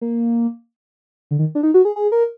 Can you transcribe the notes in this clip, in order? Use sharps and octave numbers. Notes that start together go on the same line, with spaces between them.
A#3
D3
D#3
D4
D#4
F#4
G#4
G#4
A#4